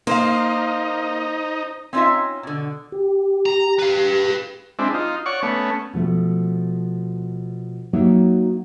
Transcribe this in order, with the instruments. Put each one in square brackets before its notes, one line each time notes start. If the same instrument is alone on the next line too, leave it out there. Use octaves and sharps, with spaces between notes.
[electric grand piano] A#3 F5 [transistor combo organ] D#4 [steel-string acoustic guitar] C5
[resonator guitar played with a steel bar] C4 C#4 D#4 F4 D#5 E5
B2 D3
[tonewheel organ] G4
[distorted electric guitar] A#5
B4 F5
[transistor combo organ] G#3 C4 D4 E4
D#4 F4
C#5 D5 F#5 C#6
A3 B3 C#4
[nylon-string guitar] B2 F3 A3
F#3 A#3 D#4 F#4 C#5 E5